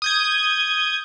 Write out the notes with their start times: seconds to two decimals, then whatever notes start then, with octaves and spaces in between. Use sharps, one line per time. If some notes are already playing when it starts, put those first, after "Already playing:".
0.02 D#6 G6 G#6